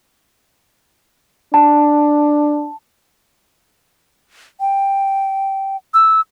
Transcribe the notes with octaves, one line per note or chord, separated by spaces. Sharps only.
D4 A5
G5
E6